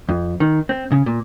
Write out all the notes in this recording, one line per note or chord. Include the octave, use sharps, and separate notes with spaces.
F2
D#3
C4
C#3
A#2